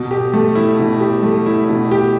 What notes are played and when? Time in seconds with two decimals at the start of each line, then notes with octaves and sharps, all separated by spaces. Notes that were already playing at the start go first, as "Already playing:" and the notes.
Already playing: B2
0.11 G4
0.33 A3
0.55 E4
0.79 B2
1.00 G4
1.23 A3
1.46 E4
1.69 B2
1.91 G4